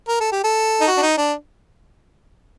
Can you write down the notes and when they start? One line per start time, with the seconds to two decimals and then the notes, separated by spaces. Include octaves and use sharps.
0.08 A#4
0.20 A4
0.32 G4
0.44 A4
0.81 D#4
0.87 F#4
0.97 D4
1.02 D#4
1.18 D4